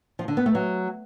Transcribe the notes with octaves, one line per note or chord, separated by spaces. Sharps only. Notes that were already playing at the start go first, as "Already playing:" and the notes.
F3
D3
B3
A3
F#3